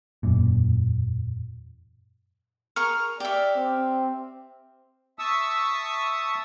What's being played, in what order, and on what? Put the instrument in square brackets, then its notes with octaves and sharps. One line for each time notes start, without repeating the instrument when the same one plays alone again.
[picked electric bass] E1 F#2 A#2
[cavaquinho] G#4 A#4 C#6 [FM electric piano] F6
[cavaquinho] G4 E5 [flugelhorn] D5
[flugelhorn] C4
[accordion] E5 A5 C#6 D#6 E6